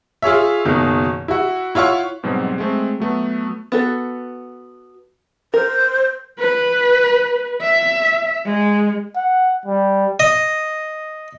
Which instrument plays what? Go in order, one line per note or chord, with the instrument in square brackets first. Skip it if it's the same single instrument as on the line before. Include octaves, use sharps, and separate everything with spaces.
[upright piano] F4 G#4 C#5 E5
F#1 B2 D#3
E4 F#4
E4 F4 C#5 F#5 C#6
[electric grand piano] G#2 B2 F#3 G3 C4
G#3 A3 C4
F#3 A3 B3
[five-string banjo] B3 F#4 A4
[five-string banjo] A#4 [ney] C5
[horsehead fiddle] B4
E5
G#3
[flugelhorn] F#5
G3
[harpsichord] D#5